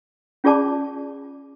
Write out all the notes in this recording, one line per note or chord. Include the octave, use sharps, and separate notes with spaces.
C#4 F4 G#4 D5 A5 D6